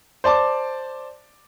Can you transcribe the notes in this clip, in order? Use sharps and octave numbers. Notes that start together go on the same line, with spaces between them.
C5 D5 A5 D6